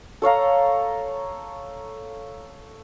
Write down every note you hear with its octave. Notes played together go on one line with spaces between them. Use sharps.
A4 C#5 F5 A#5